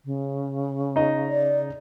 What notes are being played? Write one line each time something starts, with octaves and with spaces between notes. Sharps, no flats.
C#3
D#4 D#5
D5